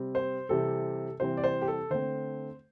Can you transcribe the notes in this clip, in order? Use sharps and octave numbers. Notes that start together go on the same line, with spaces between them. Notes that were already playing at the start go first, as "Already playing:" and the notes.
Already playing: C3 G3 C4
C5
C3 E3 G3 C4 A4
C3 E3 G3 C4 C5
D5
C5
G4
A4
D3 A3 C4 C5